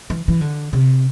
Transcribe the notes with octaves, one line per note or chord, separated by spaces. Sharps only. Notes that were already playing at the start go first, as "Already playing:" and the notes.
E3
E3
D3
C3